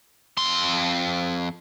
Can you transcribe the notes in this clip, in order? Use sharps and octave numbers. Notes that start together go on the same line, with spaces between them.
F2 C6